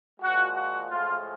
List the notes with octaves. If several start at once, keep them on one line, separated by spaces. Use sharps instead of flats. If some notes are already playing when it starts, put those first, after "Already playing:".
A#2 F3 G#3 F#4
F#4
A2 F3 G#3 F4